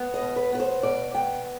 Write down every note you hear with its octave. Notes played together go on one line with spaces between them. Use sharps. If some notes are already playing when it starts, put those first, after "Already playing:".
Already playing: B3
D#5
B2
B4
B3 B4
C5
B2 D5
B3 G5